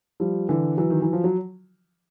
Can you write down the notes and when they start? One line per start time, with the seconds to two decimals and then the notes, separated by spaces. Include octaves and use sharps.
0.20 F3 G3
0.49 D3 E3
0.77 E3 F#3
0.90 D#3
1.02 E3
1.13 F3
1.24 F#3